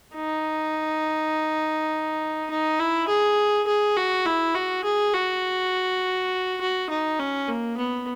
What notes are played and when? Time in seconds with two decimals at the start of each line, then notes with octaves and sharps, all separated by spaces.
0.15 D#4
2.51 D#4
2.79 E4
3.08 G#4
3.67 G#4
3.97 F#4
4.26 E4
4.55 F#4
4.84 G#4
5.14 F#4
6.61 F#4
6.90 D#4
7.19 C#4
7.48 A#3
7.77 B3